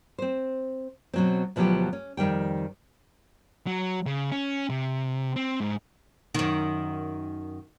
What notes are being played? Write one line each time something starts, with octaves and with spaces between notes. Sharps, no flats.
C4 C5
B2 F#3 C4
D2 B2 F3 F#3 B3 G4
C#4
F2 D#3 G3 G5
F#3
C#3
C#4
C3
C4
G#2
F#2 D#3